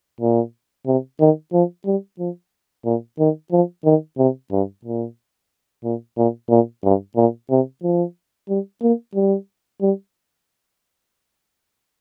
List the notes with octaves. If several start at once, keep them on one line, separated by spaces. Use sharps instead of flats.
A#2
C3
D#3
F3
G3
F3
A#2
D#3
F3
D#3
C3
G2
A#2
A#2
A#2
A#2
G2
A#2
C3
F3
G3
A#3
G3
G3